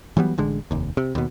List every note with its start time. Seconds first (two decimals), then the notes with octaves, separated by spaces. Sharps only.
0.17 E3 F#3 G3 B3
0.38 A1 D3 G#3
0.71 F1 D#2
0.97 C3
1.15 D#2 B2